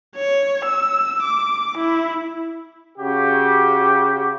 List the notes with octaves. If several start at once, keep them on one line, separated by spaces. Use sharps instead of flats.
C#5
E6
D6
E4
C#3 F#4 G4